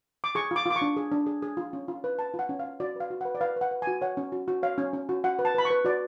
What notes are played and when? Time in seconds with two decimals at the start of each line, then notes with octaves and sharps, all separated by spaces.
0.24 D6
0.35 G#4 C#6
0.51 F4 D6
0.66 F4 D6
0.76 C#6
0.82 D4
0.97 G#4
1.12 D4
1.26 G#4
1.42 G#4
1.57 F4
1.73 C#4
1.88 F4
2.04 B4
2.19 B4 A5
2.34 F4
2.39 F#5
2.49 C#4
2.59 F5
2.65 C#4
2.80 F#4 D5
2.96 B4 F5
3.10 F#4
3.21 B4 F#5
3.35 D5
3.41 B4 F5
3.56 B4 F#5
3.71 B4
3.82 G#5
3.87 F#4
4.01 C#5 F#5
4.17 C#4
4.32 F#4
4.48 F#4
4.63 C#5 F5
4.78 C#4
4.93 C#4
5.09 F#4
5.24 F#4 F#5
5.39 B4
5.45 A5
5.55 B4 B5
5.65 C#6
5.70 B4
5.85 F#4 D5